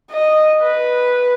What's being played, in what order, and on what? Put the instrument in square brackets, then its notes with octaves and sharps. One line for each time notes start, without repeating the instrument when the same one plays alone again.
[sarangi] D#5
B4